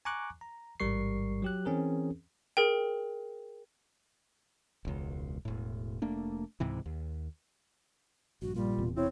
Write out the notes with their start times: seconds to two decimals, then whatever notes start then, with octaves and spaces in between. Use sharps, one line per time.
0.05 G#5 A#5 C#6 D6 F#6
0.41 A#5
0.80 A1 G#2 G3 A#4 C#6 C7
1.42 F#3 G4 F#6
1.65 E3 C4 C#4 G#4 A#4
2.57 G#4 A#4 G5
4.85 E1 C#2
5.45 E1 A2
6.02 F1 A3 A#3 D4
6.60 C#2 G#2 C3 E3
6.86 D#2
8.42 A#1 G2 F#4
8.55 A#2 G3 F4
8.78 E1 E2 C3
8.97 C4 E4 C#5